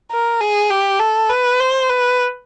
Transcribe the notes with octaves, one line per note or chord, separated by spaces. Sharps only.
A#4
G#4
G4
A4
B4
C5
B4